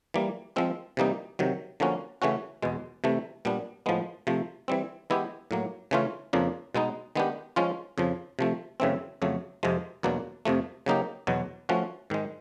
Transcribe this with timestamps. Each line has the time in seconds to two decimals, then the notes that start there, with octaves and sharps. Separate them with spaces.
0.14 E3 G3 A#3
0.56 F3 G#3 C4 F4
0.97 C3 E3 G3 A#3 D#4
1.39 C3 D#3 F#3
1.80 D3 F3 A#3 C#4 F#4
2.22 C#3 E3 A3 C#4 F#4
2.62 E2 B2 G#3
3.04 C3 E3 A3
3.45 A#2 G3 B3 D4
3.86 A2 F3 G#3 B3
4.27 C3 F3 A3
4.68 E3 G3 C4
5.10 E3 G#3 B3 E4 G4
5.51 A2 F#3 A#3
5.91 C#3 E3 A3 C#4 F4
6.33 F2 C#3 F3 A#3 D4
6.75 B2 G#3 B3 D#4
7.16 D#3 G#3 B3 D4 G4
7.56 F3 G#3 C#4 F4
7.98 F2 C#3 F3
8.39 C3 F3 A3
8.80 F#2 C#3 E3 A3 C4
9.22 F2 C#3 F#3 A3
9.63 F2 C3 F3 G#3
10.03 E2 B2 F#3 A#3 D4
10.45 F2 C3 F3 A3
10.86 C#3 F#3 A#3 D#4 G4
11.27 E2 B2 F#3
11.69 F3 A3 C#4 F#4
12.10 G#2 D#3 G#3